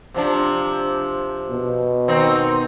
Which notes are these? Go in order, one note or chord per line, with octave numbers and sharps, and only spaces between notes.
C3 F3 D4
B2
D#3 C4 D#4